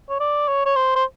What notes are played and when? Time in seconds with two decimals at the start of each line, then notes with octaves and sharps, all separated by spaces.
0.09 C#5
0.20 D5
0.48 C#5
0.66 C#5
0.76 C5
0.96 C5